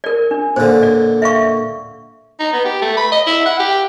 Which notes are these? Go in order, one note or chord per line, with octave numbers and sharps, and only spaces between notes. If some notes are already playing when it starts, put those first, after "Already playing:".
A#4 D5
D4
A#2 D3 C5
D5
E5 F5 C#6
D#4
B3
G4
A3
B5
D#5
E4
F#5
G4